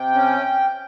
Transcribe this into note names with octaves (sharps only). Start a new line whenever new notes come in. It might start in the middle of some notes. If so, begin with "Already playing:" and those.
Already playing: C3 G5
C#4